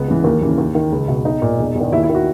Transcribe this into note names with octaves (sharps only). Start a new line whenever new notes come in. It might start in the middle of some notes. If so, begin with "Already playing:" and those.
Already playing: C#2 B3
C#3 E3
D#2 A#3
C#3 E3
D#2
D#3
C#2
B2
B1 D#4
A#2
E1
E2 D#3
D#2 E4
E4
D#3
F#4